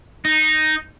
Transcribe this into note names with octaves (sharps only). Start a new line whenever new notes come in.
D#4